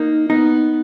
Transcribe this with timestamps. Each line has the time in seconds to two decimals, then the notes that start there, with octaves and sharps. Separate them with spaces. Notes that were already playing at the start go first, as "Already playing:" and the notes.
Already playing: A#3 D#4
0.30 B3 D#4